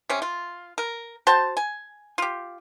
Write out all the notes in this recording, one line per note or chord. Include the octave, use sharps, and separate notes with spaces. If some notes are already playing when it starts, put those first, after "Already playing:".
C3 C#4
F4
A#4
F#4 C5 G5 A5
G#5
F4 G4